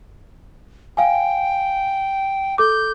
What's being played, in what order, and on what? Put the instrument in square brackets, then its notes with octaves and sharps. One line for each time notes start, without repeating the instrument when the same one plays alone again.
[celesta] F5 G#5 [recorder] G5
[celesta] A4 D6 [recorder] G6